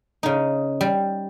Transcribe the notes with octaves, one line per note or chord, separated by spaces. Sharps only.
C#3 D#4
G3